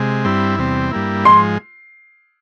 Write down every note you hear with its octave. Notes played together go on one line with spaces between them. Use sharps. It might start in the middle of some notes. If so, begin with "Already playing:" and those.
Already playing: C3 G#3
G2 G3 C4 E4
E2 C3 G3 C4
G2 G3 A#3 E4
G#2 F3 G#3 C6